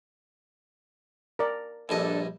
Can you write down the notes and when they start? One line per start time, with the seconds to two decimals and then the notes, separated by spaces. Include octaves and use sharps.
1.39 A#4 D5
1.89 A#1 G2 D4 A4 D#5